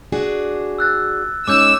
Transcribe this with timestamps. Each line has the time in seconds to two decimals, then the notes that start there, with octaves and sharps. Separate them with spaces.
0.12 D4 F#4 G#4
0.79 E6 F#6 A6
1.48 G#3 C#4 D#4 D6 E6 G6